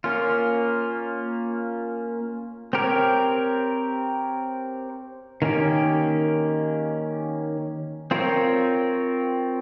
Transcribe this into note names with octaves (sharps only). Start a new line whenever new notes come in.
A#3 C#4 F4
C4 G4 A#4 C#5
D#3 A#3 C#4 G4
C4 F4 A#4 C#5